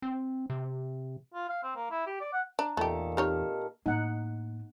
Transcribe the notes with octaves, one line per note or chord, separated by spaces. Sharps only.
C4
C3
F4
F5
C4
A#3
E4
G4
D5
F#5
D4 A#5
E2 A#2 D#3 A3 G4 A4
C4 D#4 G4 C#5 F6
A2 A#3 D#4 F#5